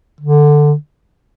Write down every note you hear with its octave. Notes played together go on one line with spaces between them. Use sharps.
D3